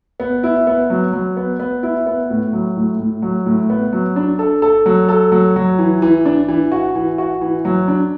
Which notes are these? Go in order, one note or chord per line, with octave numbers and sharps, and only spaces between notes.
B3
E4
B3
F#3
F#3
B3
B3
E4
B3
A2
F#3
A2
A2
F#3
A2
B3
F#3
D4
A4
A4
F#3
A4
F#3
F#3
E3
E3
D4
E3
F#4
E3
F#4
E3
F#3
D4